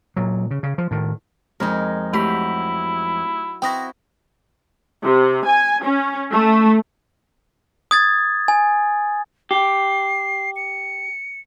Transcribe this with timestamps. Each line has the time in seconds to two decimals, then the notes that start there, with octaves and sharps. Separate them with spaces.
0.17 A#2 F#3
0.51 C#3
0.63 C#3
0.78 F3
0.91 A2 D#3
1.60 F2 G#3 D#4 A#4
2.13 F#3 A3 E4 G4 B6
3.62 C4 E4 F#4 G5 D#6 A#6
5.04 C3
5.47 G#5
5.84 C#4
6.33 A3
7.91 D#6 G#6 A6
8.48 G#5
9.51 G4 C7
10.56 C#7